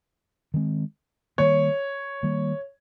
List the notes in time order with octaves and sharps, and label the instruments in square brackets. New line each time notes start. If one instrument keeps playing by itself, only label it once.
[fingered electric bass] D#3 G#3 C4
[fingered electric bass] D#3 G3 A#3 [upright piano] C#5
[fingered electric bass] D#3 G3 A#3